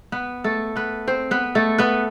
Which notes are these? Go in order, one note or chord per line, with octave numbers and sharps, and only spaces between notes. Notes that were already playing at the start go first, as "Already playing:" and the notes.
B3 B4
A3 A4
B3 B4
C4 C5
B3 B4
A3 A4
B3 B4